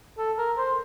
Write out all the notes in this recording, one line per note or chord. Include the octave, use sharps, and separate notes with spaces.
A4
A#4
C5